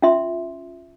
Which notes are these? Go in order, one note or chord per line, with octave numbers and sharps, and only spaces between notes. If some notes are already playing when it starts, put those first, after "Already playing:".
C#4 F4 E5 C6